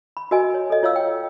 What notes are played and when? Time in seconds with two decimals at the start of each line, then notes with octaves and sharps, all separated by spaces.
0.17 B5
0.31 F#4 A#4 D#5 G#5
0.54 C#5
0.70 A4 D#5
0.83 F4 C#5 F5 E6
0.96 G5